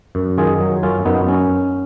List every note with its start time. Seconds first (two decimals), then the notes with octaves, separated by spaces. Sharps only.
0.15 F#2
0.38 D#3 F4 G#4
0.60 F#3
0.83 F#2 C#4 F4
1.05 F#2 B3 D#4
1.28 C#4